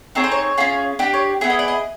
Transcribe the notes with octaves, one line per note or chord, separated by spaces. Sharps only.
C4 D#4 G#4 C#5
C5
C#5
C#4 F4 G#4
D4 G4 D5
C#5
B3 E4 G#4 E5
D#5
D5
D#5